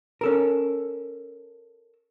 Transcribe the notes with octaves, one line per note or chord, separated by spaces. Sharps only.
C#4 A4 A#4